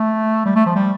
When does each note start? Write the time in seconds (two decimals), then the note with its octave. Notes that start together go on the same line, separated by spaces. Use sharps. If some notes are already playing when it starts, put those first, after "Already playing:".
Already playing: A3
0.46 G3
0.56 A3
0.66 F3
0.76 G3